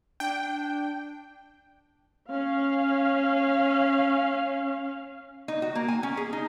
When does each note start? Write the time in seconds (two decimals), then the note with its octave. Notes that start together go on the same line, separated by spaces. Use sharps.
0.20 D4 G5
2.30 C#4 F5
5.48 D#4
5.62 F#4
5.75 A#3
5.88 G#5
6.03 C#4
6.17 G#4
6.33 D#4